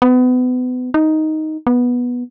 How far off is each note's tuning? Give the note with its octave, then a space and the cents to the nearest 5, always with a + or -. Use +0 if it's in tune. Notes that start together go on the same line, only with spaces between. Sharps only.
B3 +30
D#4 +5
B3 -10